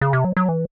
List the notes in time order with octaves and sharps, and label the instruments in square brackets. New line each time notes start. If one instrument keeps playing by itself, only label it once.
[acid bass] C#3
C3
F#3
F#3
E3